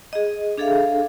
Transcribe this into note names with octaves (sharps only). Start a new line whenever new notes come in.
G#4 D#5
D4 G#4 A4 E5 F5